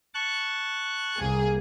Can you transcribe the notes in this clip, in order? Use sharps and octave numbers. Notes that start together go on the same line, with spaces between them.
A5 C#6 F#6
C2 A#3 G#4